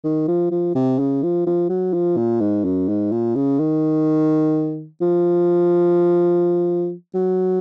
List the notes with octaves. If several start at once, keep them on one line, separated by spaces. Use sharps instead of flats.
D#3
F3
F3
C3
C#3
F3
F3
F#3
F3
A#2
G#2
F#2
G#2
A#2
C#3
D#3
F3
F#3